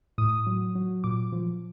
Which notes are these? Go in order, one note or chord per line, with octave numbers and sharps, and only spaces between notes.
A2 D#6
F#3
F#3
A#2 D6
F3